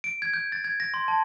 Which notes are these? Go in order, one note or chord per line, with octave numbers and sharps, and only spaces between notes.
D7
G#6
G6
A6
G#6
A#6
C6
A5